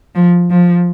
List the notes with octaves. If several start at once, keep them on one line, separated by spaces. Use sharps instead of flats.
F3
F3